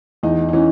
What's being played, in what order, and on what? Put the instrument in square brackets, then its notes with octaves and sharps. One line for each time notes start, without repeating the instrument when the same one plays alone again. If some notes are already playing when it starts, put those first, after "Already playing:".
[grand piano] E2 [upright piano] D#4
[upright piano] D#4
[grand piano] E3 [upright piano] C#4